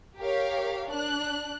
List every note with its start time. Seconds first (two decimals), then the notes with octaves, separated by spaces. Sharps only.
0.19 G4 A#4 C#5 F5
0.87 D4 F#6